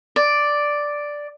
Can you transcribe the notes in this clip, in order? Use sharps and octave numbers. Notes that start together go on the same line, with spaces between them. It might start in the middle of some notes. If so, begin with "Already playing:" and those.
D5